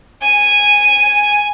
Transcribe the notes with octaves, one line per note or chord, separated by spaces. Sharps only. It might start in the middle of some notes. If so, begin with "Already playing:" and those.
G#5